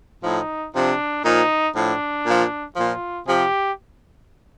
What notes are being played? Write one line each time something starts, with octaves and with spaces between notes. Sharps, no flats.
A2 F3 D#4
C3 F3 D4
A#2 F3 D#4
A2 F3 D4
A#2 F3
A#2 F3 F4
C3 F3 G4